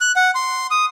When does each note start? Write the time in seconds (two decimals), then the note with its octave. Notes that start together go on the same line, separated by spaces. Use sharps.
0.01 F#6
0.16 F#5
0.35 C6
0.71 D#6